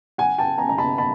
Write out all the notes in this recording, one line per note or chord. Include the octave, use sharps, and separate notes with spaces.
F#5 G#5
G5 A5
G#5 A#5
A#5
A5 B5
A5 B5